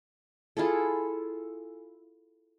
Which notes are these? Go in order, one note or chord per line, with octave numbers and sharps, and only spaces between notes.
E4 F4 G#4 A4